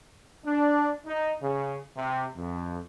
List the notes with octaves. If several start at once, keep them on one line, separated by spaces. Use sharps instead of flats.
D4
D#4
C#3
C3
F2